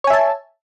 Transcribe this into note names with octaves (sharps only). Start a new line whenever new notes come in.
C#5 E5 G#5 A5